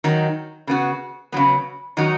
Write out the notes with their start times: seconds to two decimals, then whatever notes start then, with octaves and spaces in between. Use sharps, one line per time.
0.04 D#3 F#3 D#4
0.67 C#3 B3 F#4
1.32 C#3 F#3 B3
1.97 D#3 F#3 D#4 F#4